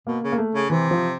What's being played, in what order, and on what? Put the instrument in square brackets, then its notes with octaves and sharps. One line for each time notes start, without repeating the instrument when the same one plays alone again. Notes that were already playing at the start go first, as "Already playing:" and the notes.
[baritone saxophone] B2 [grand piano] A#3
[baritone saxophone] C#3
[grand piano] A#3
A3
[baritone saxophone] C#3
[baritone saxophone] C3 [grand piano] E3
[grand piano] F3